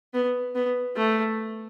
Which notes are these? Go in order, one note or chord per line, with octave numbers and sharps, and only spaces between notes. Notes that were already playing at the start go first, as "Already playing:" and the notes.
B3
B3
A3